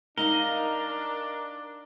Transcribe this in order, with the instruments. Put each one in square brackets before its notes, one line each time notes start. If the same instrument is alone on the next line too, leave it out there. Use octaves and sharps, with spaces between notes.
[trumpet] D4 [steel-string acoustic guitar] D#4 D#5 F5 [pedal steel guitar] A#4 [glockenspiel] G7